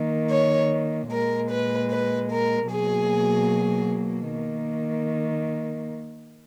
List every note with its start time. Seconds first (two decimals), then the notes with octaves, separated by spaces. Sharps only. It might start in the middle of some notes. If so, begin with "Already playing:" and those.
Already playing: D#3 A#3
0.30 C#5
1.11 A#2 G#3 A#4
1.50 B4
1.91 B4
2.31 A#4
2.70 B2 F#3 A#3 G#4
4.31 D#3 A#3